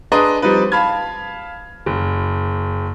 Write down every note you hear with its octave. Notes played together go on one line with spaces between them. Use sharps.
D4 G#4 B4 D#5 A#5 C6
F3 G3 C4 D#4 B4
F5 A5 B5 F6 G#6
F#1